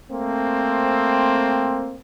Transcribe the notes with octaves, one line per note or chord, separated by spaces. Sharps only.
A3 A#3 C4